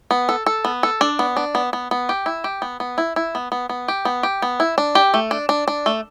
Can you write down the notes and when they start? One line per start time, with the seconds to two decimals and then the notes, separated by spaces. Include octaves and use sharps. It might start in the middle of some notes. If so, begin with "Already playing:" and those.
0.11 B3
0.29 A4
0.46 A4
0.65 B3
0.83 A4
1.01 D4
1.19 B3
1.37 D4
1.55 B3
1.73 B3
1.91 B3
2.09 G4
2.26 E4
2.44 G4
2.62 B3
2.80 B3
2.98 E4
3.16 E4
3.35 B3
3.52 B3
3.69 B3
3.88 G4
4.05 B3
4.23 G4
4.42 B3
4.60 E4
4.78 D4
4.95 G4
5.14 A3
5.31 D4
5.49 D4
5.68 D4
5.86 A3